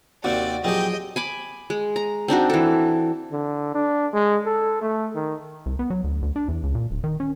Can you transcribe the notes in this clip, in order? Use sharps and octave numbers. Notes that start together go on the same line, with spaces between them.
D#2 C3 C4 F#4 D5
F3 F#3 C4 G4 G#4 D#5 G5
G#5 B5 D6
G#3
A#5
C4 D4 D#4 F#4
E3 A4
D3
D4
G#3
A4
A3
D#3
C2
B3
F#3
D2
D2
D4
E2
C#2
A#2
D1
D#3
C#4